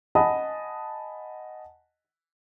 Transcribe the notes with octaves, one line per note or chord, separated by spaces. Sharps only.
D#5 F#5 G#5 A5 B5 D#6